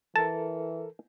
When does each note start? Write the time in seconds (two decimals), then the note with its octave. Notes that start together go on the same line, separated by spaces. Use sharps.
0.16 E3 A4 A#4 A5